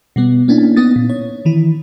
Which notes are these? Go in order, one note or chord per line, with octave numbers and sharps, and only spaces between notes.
B2 G3 B3
A#3 C#4 D4 E4
B3 D#4 D#6 A6
A#2
C#5
D#3 E3 E4